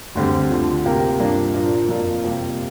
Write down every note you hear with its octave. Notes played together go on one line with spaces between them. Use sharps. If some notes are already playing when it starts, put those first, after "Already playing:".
D2 D3 G3 C4
D2 D3 F3
C3 A#3 G4 A#4
G2 F3 A#3 D4
A#2 F3 D4 A#4
F2 F3 A#3 F4 A#4
C3 G3 A#3 G4